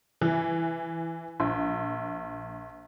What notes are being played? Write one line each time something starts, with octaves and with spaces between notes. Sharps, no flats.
E3
A#1